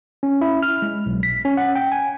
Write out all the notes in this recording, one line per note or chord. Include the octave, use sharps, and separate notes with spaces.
C#4
E4
F6
G#3
B1
B6
C#4
F#5
G5
G#5